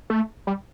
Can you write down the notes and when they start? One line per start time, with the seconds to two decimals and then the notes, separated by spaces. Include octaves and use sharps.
0.10 A3
0.47 G3